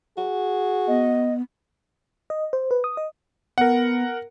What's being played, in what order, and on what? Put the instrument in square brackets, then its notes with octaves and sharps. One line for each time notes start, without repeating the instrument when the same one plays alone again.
[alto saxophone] F#4 [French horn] G#4
[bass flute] B3 [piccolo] D#5
[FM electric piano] D#5
C5
B4
D#6
D#5
[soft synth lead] B3 [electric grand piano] A#4 F#5